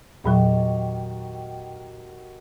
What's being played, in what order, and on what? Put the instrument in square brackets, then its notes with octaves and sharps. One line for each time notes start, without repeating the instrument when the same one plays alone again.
[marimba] E2 A#2 F#3 [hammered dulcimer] D#3 F#4 G4